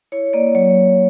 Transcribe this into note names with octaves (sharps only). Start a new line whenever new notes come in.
E4 C#5
A#3 D5
F#3 C#5